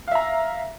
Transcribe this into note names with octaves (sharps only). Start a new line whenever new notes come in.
E5 F5 A#5